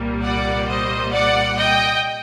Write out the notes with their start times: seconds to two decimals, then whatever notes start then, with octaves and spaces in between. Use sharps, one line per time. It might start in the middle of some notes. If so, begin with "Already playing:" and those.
Already playing: C2 A#2 G3 A#3
0.23 D5 F#5
0.67 C5 D#5
1.12 D5 F#5
1.57 D#5 G5